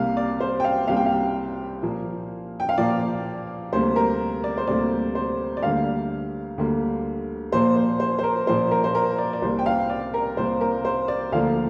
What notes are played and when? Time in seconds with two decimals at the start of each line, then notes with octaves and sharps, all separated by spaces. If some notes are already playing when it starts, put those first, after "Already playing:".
Already playing: C2 C3 G3 A#3 F5
0.17 D5
0.40 C5
0.60 G5
0.64 F5
0.88 C2 C3 G3 A#3 F5
0.97 G5
1.06 F5
1.83 A#2 F3 A#3
2.60 G5
2.69 F5
2.78 A#2 F3 A#3 D5
3.73 D2 C3 G3 A#3 C5
3.96 A#4
4.44 D5
4.58 C5
4.67 D2 C3 G3 A#3 D5
5.15 C5
5.57 D5
5.62 D2 D3 G3 A#3 F5
6.58 D2 D3 G3 A#3
7.52 A#2 F3 A#3 C5
7.76 C5
8.00 C5
8.19 C5
8.24 A#4
8.47 A#2 F3 A#3 C5
8.71 A#4
8.84 C5
8.95 A#4
9.18 D5
9.33 D5
9.42 C2 C3 A#3 C5
9.59 G5
9.66 F5
9.90 D5
10.14 A#4
10.37 C2 C3 A#3 C5
10.61 A#4
10.85 C5
11.08 D5
11.32 D2 D3 F3 A#3 F5